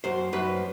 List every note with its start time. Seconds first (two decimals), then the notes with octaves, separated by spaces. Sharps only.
0.04 F#2 C5
0.33 F#2 B4